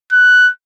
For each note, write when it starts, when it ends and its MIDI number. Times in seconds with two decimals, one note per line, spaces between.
0.12 0.50 90